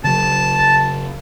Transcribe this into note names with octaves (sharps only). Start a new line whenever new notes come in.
C#3 F#3 A5